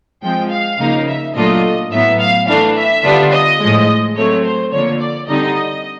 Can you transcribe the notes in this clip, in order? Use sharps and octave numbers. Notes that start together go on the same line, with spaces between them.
F3 G#3 C4 G5
F5
C#3 F3 A#3 D#4
E5
A#2 F#3 A3 D4 F4 D#5
A2 F#3 B3 E5
F5
E3 A3 D4 F5
E5
D3 G3 B3 D4 F4
D#5
A2 F3 G#3
F#3 A3 C4 C#5
C5
D3 F3 A#3 C#5
D5
D3 G3 C4 D#4 D#5